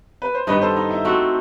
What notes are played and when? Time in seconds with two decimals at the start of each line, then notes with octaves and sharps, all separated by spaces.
0.22 B4
0.35 C5
0.47 G2 D#3 G3 B3 B4 D#5
0.61 A4 C5
0.76 D#4
0.91 E4
1.05 A3 C4 F#4